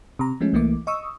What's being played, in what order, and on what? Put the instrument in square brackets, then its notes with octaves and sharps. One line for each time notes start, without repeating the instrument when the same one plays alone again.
[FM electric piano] C3 A#5
F3 G#3 A3 C#4
C2 E3 A3 A#3 D6
D#5 C#6 D#6 E6